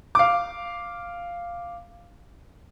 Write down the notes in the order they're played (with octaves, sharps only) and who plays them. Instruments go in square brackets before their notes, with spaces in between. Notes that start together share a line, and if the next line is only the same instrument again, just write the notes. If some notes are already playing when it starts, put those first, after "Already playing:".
[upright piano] F5 D6